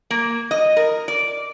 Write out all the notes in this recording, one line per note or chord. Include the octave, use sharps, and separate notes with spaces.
A#3
D#5
A#4
D5